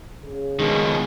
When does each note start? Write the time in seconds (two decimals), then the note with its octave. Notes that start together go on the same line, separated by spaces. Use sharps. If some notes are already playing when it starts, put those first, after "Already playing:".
0.24 C#3 G#4
0.59 B2 D#3 G#3